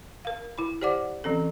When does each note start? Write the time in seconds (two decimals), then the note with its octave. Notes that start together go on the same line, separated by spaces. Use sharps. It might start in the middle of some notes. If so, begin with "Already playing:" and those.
0.25 A#4 F5
0.58 E4 B5
0.81 G4 C5 D5 F#5 D6
1.24 E3 C4 C#4 A4